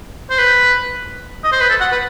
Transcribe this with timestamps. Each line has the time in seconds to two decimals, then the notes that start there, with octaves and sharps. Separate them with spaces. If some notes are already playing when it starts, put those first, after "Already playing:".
0.30 C5
0.39 B4
1.44 D#5
1.52 C5
1.61 B4
1.69 A4
1.80 F#5
1.92 B4